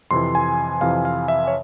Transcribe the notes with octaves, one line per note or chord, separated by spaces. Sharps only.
F2 C3 E3 C6
G#5
F2 C3 E3 F5
F5
E5
C#5